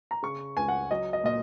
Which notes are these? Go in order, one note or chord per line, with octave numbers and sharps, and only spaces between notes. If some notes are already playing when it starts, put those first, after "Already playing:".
A#5
C#3 C#6
C#2 G#5
F#5
F#3 D#5
D#5
A#2 D#5